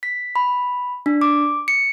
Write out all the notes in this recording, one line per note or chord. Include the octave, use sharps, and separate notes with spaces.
B6
B5
D4
D6
C#7